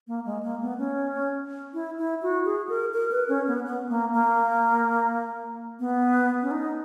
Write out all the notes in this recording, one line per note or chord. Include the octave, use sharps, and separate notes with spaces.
A#3
G#3
A#3
B3
C#4
E4
E4
F#4
G#4
A#4
A#4
B4
C#4
B3
B3
A#3
A#3
B3
C#4
D#4